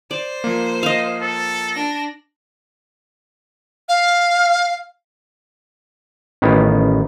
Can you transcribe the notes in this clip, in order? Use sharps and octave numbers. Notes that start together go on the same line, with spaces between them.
C5 D5
F3 A#3
D#5 F5
A4
D4 A#6
F5
A1 D#3 B3